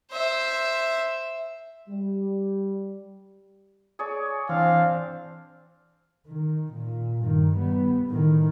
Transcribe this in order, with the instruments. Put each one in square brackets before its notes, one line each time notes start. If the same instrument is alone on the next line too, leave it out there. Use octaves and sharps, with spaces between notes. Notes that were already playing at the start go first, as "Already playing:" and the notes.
[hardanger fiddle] C5 E5
[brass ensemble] G3
[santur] G#4 C#5 D5
[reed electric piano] E3 [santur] C4 [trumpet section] D4 F5
[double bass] D#3
A#2
G2 D#3
G3 B3
A2 D#3